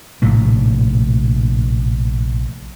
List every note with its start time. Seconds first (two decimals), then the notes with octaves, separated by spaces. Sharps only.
0.22 A#1 A2 C3 A3